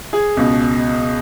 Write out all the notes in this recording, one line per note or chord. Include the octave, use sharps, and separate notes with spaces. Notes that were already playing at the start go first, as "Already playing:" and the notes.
G#4
C#2 B2